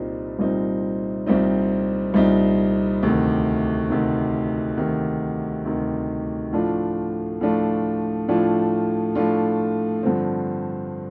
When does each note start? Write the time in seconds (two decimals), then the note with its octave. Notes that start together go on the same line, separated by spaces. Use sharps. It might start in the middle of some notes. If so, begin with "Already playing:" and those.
Already playing: C2 A#2 G3 C4 D#4
0.39 C2 A#2 G3 C4 D#4
1.26 C2 A#2 G3 C4 D#4
2.14 C2 A#2 G3 C4 D#4
3.03 D2 C3 D#3
3.90 D2 C3 D#3
4.78 D2 C3 D#3
5.65 D2 C3 D#3
6.53 A2 F3 A3 D4 F4
7.41 A2 F3 A3 D4 F4
8.28 A2 F3 A3 D4 F4
9.15 A2 F3 A3 D4 F4
10.03 G2 D3 F3 C4